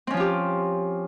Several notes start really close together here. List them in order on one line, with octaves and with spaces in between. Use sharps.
C4 C#4 F3 F4 G4